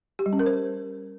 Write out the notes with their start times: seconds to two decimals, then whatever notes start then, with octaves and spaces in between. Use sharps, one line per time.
0.19 G4
0.26 G3
0.33 C#4
0.39 A#4
0.46 C5